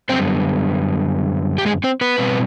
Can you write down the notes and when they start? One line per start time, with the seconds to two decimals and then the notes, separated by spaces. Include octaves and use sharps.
0.09 F#2 D3 G3 B3 C4 C5
1.58 G4
1.66 G#3 G#4
1.84 C4 C5
2.01 B3 B4
2.18 B2 G3 C4